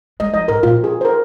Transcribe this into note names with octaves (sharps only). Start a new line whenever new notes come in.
G#3 D#5
F3 D#5
G#2 A#4
A#2 F4
G#4
C5
A#4